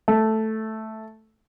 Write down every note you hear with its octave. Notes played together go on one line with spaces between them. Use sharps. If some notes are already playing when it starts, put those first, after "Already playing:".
A3